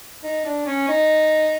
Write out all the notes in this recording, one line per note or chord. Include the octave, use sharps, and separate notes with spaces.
D#4
D4
C#4
D#4